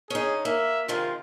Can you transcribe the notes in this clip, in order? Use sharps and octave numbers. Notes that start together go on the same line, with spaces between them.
C#4 D#4 G#4
A#3 E5
C3 D#3 G#3 F4